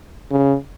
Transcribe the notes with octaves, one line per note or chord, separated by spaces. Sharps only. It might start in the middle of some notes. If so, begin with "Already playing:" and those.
C#3